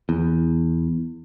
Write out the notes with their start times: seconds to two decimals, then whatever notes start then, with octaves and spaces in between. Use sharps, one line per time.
0.09 E2